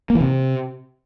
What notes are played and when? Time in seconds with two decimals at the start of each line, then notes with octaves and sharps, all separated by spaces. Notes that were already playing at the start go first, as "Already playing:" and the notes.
0.10 A#3
0.15 E3
0.21 C3